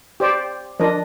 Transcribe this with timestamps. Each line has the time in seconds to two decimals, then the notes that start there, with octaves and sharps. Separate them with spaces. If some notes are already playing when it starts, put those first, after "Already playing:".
0.20 G4 C5 D5
0.80 F3 D4 A#4 D#5